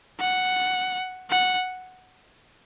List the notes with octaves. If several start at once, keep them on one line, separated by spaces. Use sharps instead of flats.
F#5
F#5